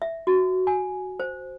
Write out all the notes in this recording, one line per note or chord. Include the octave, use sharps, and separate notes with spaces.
E5
F#4
G#5
C5